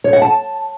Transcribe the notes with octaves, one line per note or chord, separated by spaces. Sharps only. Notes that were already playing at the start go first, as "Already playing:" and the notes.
C#5
F#5
A5